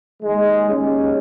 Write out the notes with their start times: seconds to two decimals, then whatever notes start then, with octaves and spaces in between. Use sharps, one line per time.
0.23 D#2 D#3 G#3
0.68 G#3 C#4